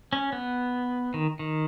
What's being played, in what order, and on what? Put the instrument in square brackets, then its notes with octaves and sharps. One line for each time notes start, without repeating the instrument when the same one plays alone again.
[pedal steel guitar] C#4
B3
D#3
D#3